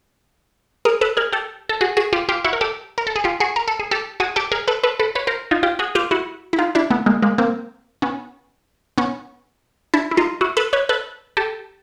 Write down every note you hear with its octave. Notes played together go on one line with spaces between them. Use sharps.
G#4 A#4
A4 B4
G#4 A#4
G4 A4
A4
F#4 G#4
F#4 G#4
F4 G4
F4 G4
E4 F#4
A#4
G4 A4
A#4
A4
G#4
F4 G4
F#4 G#4
A#4
A4
G#4
G4 A4
F#4 G#4
G4 A4
G#4 A#4
A4 B4
A4 B4
A4 B4
B4 C#5
A#4 C5
D#4 F4
F4 G4
F#4 G#4
F4 G4
E4 F#4
E4
D#4 F4
D4 E4
A3 B3
G#3 A#3
G#3 A#3
A#3 C4
B3 C#4
B3 C#4
D4 E4
E4
D#4 F4
E4 F#4
A4 B4
B4 C#5
A4 B4
G4 A4